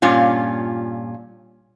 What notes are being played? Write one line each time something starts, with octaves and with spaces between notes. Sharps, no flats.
G2 A#2 C#4 F4